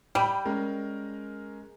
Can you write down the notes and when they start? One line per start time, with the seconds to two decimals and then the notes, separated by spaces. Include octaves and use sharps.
0.15 G3 G5 B5 G6
0.45 G#3 C#4 A#4